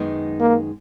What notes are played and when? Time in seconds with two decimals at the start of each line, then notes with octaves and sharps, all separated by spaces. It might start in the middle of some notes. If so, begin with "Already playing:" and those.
Already playing: F#2 D#3 G#3 B3 D#4
0.40 A#3